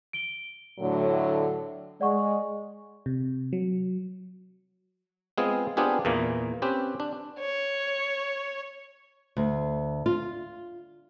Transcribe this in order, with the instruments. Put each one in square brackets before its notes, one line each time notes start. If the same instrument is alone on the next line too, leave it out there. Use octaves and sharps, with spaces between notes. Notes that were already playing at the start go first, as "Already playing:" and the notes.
[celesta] D7 G7
[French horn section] A2 D3 F#3
[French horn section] G#3 [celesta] D5 F#5 C#6
[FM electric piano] C3
F#3
[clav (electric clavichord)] G#3 B3 C4 F4 G#4
B3 C4 D4 F4 G4 G#4
E2 A#2 E3 A#3
C4 C#4 G4 B4
D4
[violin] C#5
[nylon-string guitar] D2
F4